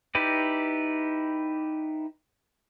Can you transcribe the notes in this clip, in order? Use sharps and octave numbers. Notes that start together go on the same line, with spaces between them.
D#4 E4 G4 B4 D5